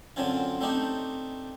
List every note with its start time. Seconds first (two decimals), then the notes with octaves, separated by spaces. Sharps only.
0.16 F#2 D3 F3 C4 C#4 F4
0.61 A3 C4 D4 D#4 G4